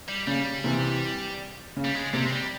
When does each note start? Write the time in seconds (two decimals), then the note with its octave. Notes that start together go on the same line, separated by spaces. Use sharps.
0.09 G3
0.27 C#3 G3
0.64 C3 E3
1.77 C#3
1.84 G3
1.95 G#3
2.13 C3 G3
2.26 G#3
2.32 G3